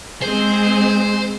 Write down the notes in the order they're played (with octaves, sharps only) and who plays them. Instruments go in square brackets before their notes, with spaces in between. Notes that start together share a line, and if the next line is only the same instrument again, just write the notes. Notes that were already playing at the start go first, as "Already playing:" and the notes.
[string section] G#3 C4 G#4 [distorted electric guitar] C5